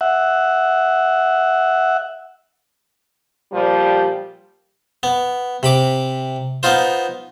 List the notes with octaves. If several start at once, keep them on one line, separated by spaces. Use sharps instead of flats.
E5 F#5
A#2 F3 G3
B3
C3 B5 D6
B3 D#4 F4 C5